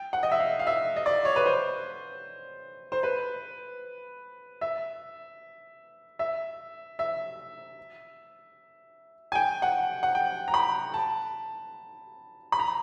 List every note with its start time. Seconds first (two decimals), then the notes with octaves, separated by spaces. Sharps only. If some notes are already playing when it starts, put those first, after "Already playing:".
Already playing: G5
0.13 F#5
0.23 D#5
0.31 E5
0.40 F5
0.59 F5
0.67 E5
0.96 D#5
1.06 D5
1.25 C#5
1.36 B4
1.46 C5
2.92 C5
3.03 B4
4.61 E5
6.19 E5
6.99 E5
9.32 G#5
9.35 G5
9.62 F#5
10.03 F#5
10.15 G5
10.48 A#5
10.54 B5
10.94 A5
12.52 B5
12.59 A#5